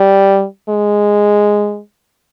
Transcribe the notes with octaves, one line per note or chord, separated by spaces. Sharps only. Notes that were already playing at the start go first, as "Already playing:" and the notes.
Already playing: G3
G#3